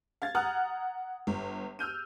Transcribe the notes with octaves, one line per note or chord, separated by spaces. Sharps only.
F5 G#6 A6
F#5 A#5 D#6 F6 F#6
G1
E6 F6 G6 D#7